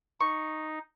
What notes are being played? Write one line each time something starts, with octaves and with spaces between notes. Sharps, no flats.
D#4 C#6